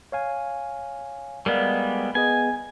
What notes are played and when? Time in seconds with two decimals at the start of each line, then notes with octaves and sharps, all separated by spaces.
0.12 C#5 F5 G#5
1.46 G3 G#3 B3 A#4 D5 F5
2.15 B3 G#4 D#5 G#5